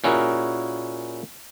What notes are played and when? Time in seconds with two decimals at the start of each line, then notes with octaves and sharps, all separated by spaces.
0.04 A#2 C#4 E4 F#4 G#4 A#4